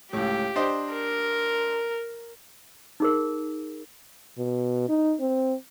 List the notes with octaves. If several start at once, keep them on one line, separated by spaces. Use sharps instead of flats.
C#2 A2 G4
D4 C5 D#5
A#4
D#4 G#4 A#4
B2
D#4
C4